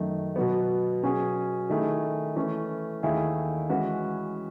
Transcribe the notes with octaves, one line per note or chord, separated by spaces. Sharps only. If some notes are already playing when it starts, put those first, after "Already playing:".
Already playing: F#2 D#3 A3
B2 F#3 B3
B2 F#3 C#4 G#4
D#3 A3 E4 G#4
E3 A3 C#4
D#2 D#3 A3 E4 G#4
E3 G#3 C#4 F#4 B4